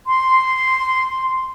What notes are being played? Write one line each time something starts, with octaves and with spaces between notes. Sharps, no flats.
C6